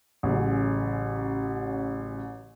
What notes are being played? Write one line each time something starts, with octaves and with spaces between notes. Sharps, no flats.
A1 C#3 F#3